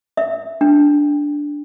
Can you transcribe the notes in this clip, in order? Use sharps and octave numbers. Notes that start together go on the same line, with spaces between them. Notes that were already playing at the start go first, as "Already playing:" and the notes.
E5
D4